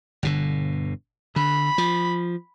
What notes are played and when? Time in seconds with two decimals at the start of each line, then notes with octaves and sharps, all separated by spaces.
0.23 G1 B2 D3
1.36 D3 B5
1.78 F3